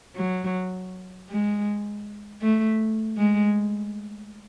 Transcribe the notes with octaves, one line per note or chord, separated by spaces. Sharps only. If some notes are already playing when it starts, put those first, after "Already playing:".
F#3
G#3
A3
G#3